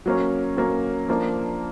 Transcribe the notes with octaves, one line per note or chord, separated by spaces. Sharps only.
F#3 A#3 C#4
F#3 A#3 C#4
F3 A#3 D4